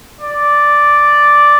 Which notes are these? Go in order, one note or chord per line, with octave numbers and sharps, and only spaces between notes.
D5